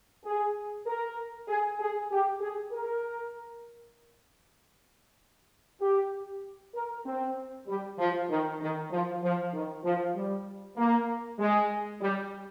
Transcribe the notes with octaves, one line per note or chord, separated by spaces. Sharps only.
G#4
A#4
G#4
G#4
G4
G#4
A#4
G4
A#4
C4
G3
F3
D#3
D#3
F3
F3
D#3
F3
G3
A#3
G#3
G3